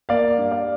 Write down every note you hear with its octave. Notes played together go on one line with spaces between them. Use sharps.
A#3 D5 F5
G2
D5 F5